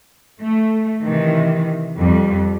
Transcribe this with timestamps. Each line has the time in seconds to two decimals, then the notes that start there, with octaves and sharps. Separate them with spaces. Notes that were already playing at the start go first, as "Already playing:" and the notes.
0.40 A3
1.02 C3 D#3 E3
1.95 F2 G3